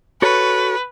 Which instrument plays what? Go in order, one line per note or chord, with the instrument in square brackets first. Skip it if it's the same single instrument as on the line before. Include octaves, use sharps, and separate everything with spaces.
[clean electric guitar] F#4 A4 C#5 [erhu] B4